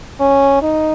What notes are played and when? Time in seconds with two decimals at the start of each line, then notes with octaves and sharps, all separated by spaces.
0.20 C#4
0.62 D#4